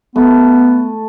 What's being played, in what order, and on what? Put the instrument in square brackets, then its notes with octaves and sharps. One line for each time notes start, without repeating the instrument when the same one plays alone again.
[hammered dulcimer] A3 [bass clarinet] B3